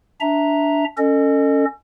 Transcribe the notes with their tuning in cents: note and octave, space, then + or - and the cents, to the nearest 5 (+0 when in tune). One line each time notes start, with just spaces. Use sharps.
D4 -10 E5 -5 A#5 +0
C#4 +5 A4 +30 D#5 -25